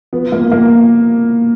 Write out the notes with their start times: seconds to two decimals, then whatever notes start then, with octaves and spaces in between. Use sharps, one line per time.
0.13 F3 B3
0.32 F3 A#3
0.51 F3 A#3